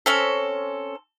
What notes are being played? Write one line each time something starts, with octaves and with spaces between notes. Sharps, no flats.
C4 C#4 A4